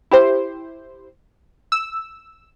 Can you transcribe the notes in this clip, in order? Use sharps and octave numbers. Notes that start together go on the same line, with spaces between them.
E4 G4 C5
E6